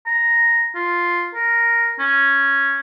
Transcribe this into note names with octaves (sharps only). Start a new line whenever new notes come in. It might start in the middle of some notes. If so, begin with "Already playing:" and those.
A#5
F4
A#4
C#4